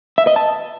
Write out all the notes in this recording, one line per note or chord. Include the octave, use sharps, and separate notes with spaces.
E5
D#5
A5